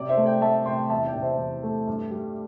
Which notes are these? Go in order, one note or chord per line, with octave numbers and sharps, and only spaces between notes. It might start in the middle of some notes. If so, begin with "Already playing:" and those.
Already playing: C3 D5
C5 E5
A3
D5 G5
A3 E5 A5
C3 G5 C6
E2 E5 A5
D5 G5
C3
C5 E5
E2
A3
G2
G3